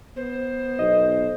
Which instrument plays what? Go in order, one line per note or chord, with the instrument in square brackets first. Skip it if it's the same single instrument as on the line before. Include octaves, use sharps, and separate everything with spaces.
[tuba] B3 [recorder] C5
[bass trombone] B1 [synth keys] D#5